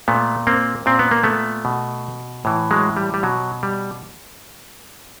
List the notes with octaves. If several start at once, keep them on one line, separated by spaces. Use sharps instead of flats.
A#2 A3 B3
A#3 C4
A#2 C4
B3
A#3
A3 B3
B2
A2 E3
F#3 G#3
G3
G3
B2 F#3
G3